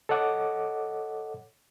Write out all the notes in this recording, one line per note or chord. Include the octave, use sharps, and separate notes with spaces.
A4 C#5 D#5 F#5 D6